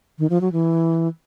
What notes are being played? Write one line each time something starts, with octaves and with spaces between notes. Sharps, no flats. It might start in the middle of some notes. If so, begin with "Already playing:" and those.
D#3
F3
F#3
E3